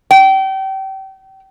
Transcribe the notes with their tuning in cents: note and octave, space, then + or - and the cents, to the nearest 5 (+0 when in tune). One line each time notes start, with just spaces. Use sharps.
G5 -30